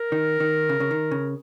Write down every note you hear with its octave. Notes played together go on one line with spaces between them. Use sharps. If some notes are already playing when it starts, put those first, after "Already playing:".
Already playing: A#4
D#3
D#3
C#3
C#3
D#3
C#3